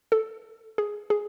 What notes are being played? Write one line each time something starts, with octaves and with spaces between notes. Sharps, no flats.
A4
G#4
G#4